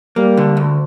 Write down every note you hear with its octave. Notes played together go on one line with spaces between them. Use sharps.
G3 A#3
D3
D2